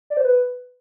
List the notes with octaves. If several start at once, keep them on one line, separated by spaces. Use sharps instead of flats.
D5
C5
B4